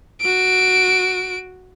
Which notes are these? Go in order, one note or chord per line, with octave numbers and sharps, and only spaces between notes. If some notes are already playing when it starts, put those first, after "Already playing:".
F#4 D7